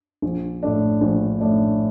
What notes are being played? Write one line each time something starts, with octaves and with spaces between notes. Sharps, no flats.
A#1
A2 A3 D4
A#1
A2 A3 D4